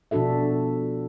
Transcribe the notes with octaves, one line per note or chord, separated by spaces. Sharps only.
B2 F3 D4 F#4 A4 E5